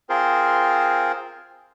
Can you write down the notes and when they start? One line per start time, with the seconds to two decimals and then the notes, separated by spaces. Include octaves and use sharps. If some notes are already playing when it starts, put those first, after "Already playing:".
0.09 C4 F4 G#4 A#4 C5